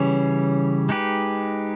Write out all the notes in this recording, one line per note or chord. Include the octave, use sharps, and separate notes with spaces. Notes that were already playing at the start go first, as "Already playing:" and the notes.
Already playing: C#3 E3 G3 C#4
G#3 D#4 G4 B4